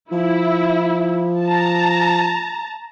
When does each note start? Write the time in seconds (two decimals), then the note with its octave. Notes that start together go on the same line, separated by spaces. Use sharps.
0.11 F3 E4
1.44 A5 A#5